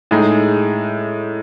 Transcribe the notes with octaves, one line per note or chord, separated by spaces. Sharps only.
A2 G#3 D#4 G#4